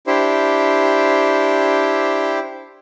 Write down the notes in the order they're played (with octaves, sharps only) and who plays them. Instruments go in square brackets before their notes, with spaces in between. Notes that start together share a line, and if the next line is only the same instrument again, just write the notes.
[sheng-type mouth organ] D4 E4 G4 C5